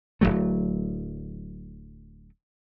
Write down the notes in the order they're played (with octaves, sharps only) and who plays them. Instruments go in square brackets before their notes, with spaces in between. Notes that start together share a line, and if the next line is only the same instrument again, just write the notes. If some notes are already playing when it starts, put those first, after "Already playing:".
[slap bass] D1 C#2 F#3 A3